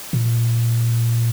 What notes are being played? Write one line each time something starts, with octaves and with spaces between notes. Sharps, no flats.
A#2